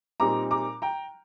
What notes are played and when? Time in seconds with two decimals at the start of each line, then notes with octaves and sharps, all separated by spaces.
0.20 A#2 G3 C4 D#4 A#5 D6
0.51 A#5 D6
0.82 G5 A#5